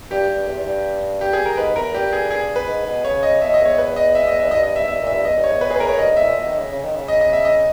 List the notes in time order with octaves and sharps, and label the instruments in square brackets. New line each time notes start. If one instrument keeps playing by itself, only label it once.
[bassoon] G2 [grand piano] G4
[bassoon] G2
E2
E2
G2
[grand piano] G4
G#4
A#4
[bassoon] G#2 [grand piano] B4
[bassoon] E2 [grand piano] A#4
[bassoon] G2 [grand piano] G4
[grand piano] G#4
G#4
B4
[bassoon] G#2
B2
[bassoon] C#3 [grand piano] C#5
[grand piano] D#5
[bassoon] B2 [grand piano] E5
[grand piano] D#5
[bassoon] E2
[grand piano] C#5
B4
D#5
E5
D#5
E5
[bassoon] E2
[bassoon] G2 [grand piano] D#5
[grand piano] D#5
E5
[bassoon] G#2
[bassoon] G2 [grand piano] E5
[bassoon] A#2
[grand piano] E5
[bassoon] G2
[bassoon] E2 [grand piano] D#5
[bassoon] G2
[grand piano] C#5
[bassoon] E2
[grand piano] B4
G#4
B4
A#4
C#5
[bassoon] G2 [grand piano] D#5
[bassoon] G#2
[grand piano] E5
[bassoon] A#2
B2
D#3
C#3
C#3
D#3
C#3
[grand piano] D#5
D#5
E5
D#5